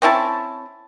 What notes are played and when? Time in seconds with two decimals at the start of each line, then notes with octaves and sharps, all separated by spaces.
0.02 C4 C#4 E4 A5